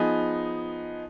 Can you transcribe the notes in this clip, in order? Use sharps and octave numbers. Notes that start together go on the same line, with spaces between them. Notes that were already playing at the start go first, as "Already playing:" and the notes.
Already playing: F3 B3 D#4 G#4